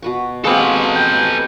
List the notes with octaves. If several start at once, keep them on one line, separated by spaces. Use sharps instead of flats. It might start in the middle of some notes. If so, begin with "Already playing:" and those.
B2 B4 C#6
G#3 A#3 C4 F#4 G4 A4 B4 F5
G5